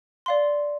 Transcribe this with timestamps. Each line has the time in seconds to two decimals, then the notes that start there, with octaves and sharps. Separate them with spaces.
0.26 D5 F5 C6